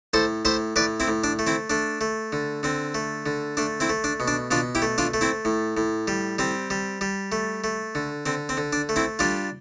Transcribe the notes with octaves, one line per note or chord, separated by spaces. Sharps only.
A2 A4 C5
A2 C5 E5
A2 B4 D5
C4 E4
A2
D4
A3
C4 E4
A3 D4
A3
D3
D3 C4
A3
D3
A3 D4
C4 E4
A3
D4
B2
D4
B2 D4 F4
E4 G4
A3
D4 F4
A3
C4 E4
A2
A2
G3
G3 C4
G3
G3
A3
A3
D3
D3 C4
C4
D3
D4
A3
C4 E4
G3 D4 F4